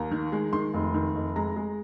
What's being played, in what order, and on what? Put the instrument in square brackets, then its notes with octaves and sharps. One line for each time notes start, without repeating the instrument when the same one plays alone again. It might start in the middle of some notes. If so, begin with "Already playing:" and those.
Already playing: [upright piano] D#2 A#5
D#3
G#3
D#3 C6
F1
D#3
F1
G#3 A#5
G#3